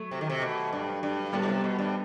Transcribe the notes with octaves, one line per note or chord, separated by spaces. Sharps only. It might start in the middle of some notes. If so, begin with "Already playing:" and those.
Already playing: F#3 A3
C3
D#3
C3
B2
G2
G2
A2 G3 B3
B2
C3
B2
G2